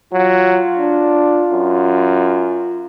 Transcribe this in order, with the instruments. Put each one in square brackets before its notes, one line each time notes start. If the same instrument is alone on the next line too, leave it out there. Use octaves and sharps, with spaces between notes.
[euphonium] F#3 [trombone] F4
[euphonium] D4
F#2